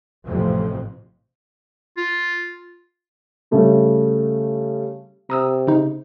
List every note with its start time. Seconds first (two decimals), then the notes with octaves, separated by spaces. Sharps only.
0.25 A1 F2 C3 F3
1.97 F4
3.51 C#3 G3 A3 F#4
5.30 C3 A#5 D#6 E6
5.67 C#3 D#4